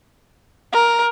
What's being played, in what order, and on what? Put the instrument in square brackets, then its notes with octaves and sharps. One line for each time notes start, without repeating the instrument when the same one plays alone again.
[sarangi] A#4